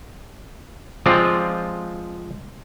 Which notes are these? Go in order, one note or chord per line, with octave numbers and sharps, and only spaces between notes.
F3 G#3 C4 F4 C5 D5